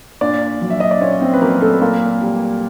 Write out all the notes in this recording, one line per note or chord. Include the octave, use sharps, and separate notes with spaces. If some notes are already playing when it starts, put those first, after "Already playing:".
A#2 D4 D5
F#3
E5
D#5
D5
A#2 C#4 C#5
C4 C5
B4
F#3 A#3 A#4
A3 A4
B4
A#2 A#3 A#4
G3